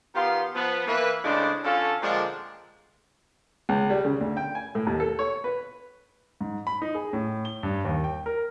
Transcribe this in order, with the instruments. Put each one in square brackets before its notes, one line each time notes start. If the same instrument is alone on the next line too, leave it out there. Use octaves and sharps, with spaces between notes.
[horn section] D#3 B3 F4 G4 C6
F3 B3
E3 A#3 B4
A2 C#3 G#3 D4 C5 D5
D3 C#4 F4 A4
A#2 D3 F3 G#3 C4 D4
[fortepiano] C#2
G3
C#3
D2
G5
G#5
A2
D#2
A4
C#5
B4
[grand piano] G#2
B5
D#4
G#4
A2
G7
G2
D#2
G5
A#4